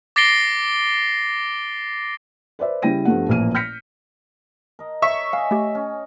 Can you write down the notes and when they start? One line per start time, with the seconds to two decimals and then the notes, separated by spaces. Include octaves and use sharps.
0.16 D6 A6 A#6 C7 D7 G7
2.59 B4 C5 D5 E5
2.82 C#3 G3 E4 G5 A#6 D#7
3.05 G2 F3 G3 A3 B3 F#5
3.29 A1 A#2 F3 A#3 F6 D#7
3.55 F6 G6 A#6 B6 C#7
4.79 A#4 D#5
5.02 C#5 E5 C#6
5.33 D#5 F5 G#5
5.51 A3 G4
5.75 C#4